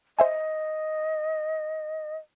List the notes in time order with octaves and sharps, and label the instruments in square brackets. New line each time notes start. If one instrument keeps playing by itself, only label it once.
[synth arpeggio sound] C5 E5 G#5 [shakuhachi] D#5